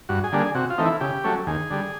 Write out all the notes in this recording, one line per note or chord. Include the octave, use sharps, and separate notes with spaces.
G2 F#4
G#4
D3 G3 A#3 D4
G#4
C3 F#4
F4
E3 A3 C4 D#4
E4
C#3 G4
F#3 A3 C#4
D#2 G#4
D3 G3